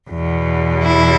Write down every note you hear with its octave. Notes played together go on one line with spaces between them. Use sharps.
E2 B2
E4